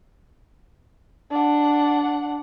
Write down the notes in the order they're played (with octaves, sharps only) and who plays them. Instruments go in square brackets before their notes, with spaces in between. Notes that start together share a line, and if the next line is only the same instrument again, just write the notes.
[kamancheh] D4 F#5